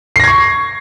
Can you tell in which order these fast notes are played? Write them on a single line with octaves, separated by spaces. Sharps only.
C7 A#6 G#6 C#6